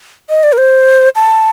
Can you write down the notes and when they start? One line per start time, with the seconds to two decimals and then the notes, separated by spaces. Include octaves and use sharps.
0.30 D#5
0.43 D5
0.53 A#4
0.58 C5
1.15 A5